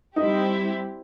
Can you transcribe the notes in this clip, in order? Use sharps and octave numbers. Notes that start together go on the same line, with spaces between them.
G3 C4 D#4 E4 G4